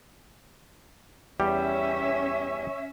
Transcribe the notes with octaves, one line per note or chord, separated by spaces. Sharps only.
E2 G3 C#4 G4 E5